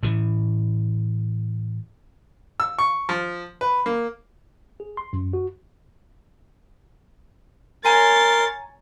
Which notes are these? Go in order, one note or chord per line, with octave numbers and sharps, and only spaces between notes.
A2 E3
E6
C#6
F3
B4
A#3
G#4
C6
F#2
F#4
A#4 C#5 G#5 A#5 C6 A6